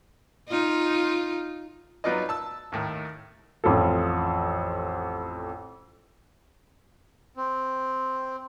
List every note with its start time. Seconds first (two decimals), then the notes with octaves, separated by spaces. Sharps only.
0.48 D#4 F4
2.04 F#3 B3 D#4 F4 D5 D#5
2.29 A5 E6
2.72 D#2 A2 D#3
3.64 A1 F2 F4 A4
7.37 C4